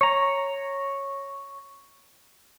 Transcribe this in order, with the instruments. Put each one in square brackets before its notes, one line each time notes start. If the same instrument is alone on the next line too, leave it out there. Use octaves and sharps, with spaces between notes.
[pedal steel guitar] C#5 A#5